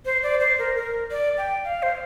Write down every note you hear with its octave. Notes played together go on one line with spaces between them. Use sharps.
C5
D5
C5
A#4
A#4
D5
G5
F5
C5